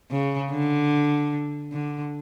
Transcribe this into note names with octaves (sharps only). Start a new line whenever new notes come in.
C#3
D3
D3